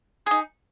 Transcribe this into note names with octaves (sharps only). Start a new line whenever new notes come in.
D#4 G#4